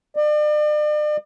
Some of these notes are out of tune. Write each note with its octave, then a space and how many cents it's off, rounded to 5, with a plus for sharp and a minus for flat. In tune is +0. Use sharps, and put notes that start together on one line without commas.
D5 +40